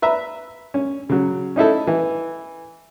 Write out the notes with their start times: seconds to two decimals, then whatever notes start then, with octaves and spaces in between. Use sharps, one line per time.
0.02 B4 E5 A#5
0.74 C#4
1.09 C#3 F#3
1.56 C#4 D#4 E4 A4
1.87 E3